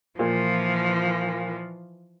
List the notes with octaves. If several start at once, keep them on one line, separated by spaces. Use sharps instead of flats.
A#2 E3 F3